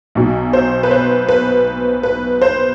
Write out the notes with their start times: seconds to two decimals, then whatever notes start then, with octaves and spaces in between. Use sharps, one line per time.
0.15 B1 B2 F#3
0.53 C5
0.83 B4
0.91 C5
1.29 B4
2.03 B4
2.41 C5